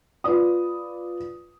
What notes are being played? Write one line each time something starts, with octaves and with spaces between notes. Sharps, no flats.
F4 B4 D5 D#6